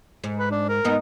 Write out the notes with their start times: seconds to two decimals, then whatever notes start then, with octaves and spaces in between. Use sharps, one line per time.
0.24 G#2
0.39 B4
0.51 D4
0.69 A#4
0.85 G#2 B3 D#4